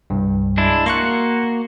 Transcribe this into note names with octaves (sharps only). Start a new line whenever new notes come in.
C2 G2
G#3 D4 E4
A#3 F#4 C6 C#6 F#6